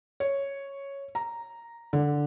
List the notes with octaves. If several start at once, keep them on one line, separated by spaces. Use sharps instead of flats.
C#5
A#5
D3